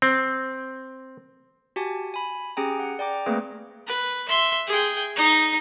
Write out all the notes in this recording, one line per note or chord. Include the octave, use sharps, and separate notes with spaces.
C4
F#4 G4 G#5 A5
G#5 B5
C#4 G4 G#4 G5 G#5 A#5
F#5
D5 G5 A#5 D6
A3 A#3 C4 G#4 B4
B4
E5 C6
G#4 G5
D#4